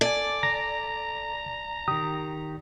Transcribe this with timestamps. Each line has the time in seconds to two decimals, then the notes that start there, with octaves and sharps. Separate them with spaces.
0.01 A4 D5 G#5
0.43 A#5 A#6
1.88 D#3 G4 D#6